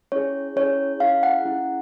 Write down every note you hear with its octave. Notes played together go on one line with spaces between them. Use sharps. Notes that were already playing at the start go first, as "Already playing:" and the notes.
C#4 E4 G#4 C#5
C#4 E4 G#4 C#5
C#4 E4 G#4 F5
F#5
C#4 E4 G#4